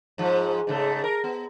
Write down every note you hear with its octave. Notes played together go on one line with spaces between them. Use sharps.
G#2 F3
G#2 C#3 A3
A#4
B3